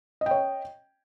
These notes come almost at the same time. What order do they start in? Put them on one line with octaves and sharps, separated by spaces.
D#5 G5 C#5